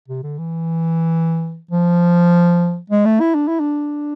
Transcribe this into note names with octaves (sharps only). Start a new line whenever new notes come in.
C3
D3
E3
F3
G#3
A3
E4
D4
E4
D4